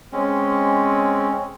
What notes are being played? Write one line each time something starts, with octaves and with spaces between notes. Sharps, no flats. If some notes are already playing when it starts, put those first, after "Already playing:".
G#3 C4 C#4